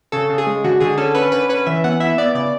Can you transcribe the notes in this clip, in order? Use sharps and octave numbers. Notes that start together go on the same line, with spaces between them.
C#3 A4
C#3
G#4
G#3
D3 F#4
D3 G#4
C#4 A4
C#4 B4
D3 B4
C#4 B4
E3 E5
B3 F#5
E4 E5
B3 D5
C#3 D5